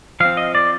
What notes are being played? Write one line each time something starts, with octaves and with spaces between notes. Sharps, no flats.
F3 C4 F5
D#5
D5